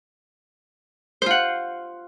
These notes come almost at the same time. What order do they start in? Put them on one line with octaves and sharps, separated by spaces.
C5 F4 F#5